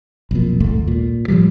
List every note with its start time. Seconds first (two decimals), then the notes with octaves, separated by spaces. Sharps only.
0.31 B1 F2 A#2
0.60 A#1 D#2 G#2 A3
0.88 A#2
1.28 A2 F3 G3